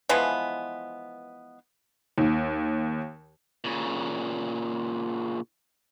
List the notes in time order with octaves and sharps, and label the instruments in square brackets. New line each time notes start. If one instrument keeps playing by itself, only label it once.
[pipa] E3 F3 G#3 B3
[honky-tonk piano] D#2
[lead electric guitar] A#2 C#3